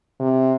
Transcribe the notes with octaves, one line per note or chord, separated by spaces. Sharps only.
C3